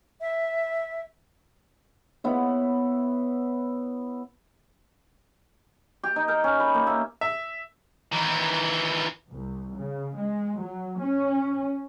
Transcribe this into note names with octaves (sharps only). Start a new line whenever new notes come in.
E5
B3 E4 C#5
G4
D#4
A#4
C#4
B5
A#3
E5
E5
D#3 E3
C2
C#3
G#3
F#3
C#4